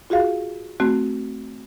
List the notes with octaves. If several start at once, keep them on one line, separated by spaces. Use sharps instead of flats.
F4 F#4 G#4 F5
A3 C4 F#4